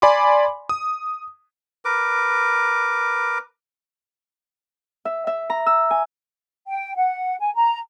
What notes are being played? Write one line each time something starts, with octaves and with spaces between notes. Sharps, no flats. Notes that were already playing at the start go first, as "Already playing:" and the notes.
D5 G#5 B5 C6 D6
D#6
A#4 B4 D6
E5
E5
A#5
E6
G#5
G5
F#5
G#5
A#5